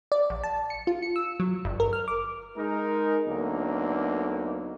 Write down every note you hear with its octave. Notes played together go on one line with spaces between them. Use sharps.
D5
A#1
A5
C#7
F4
C#7
E6
F#3
G1
A#4
F6
D6
G#3 D#4 A#4
D2 D3 F#3 A#3 B3 D#4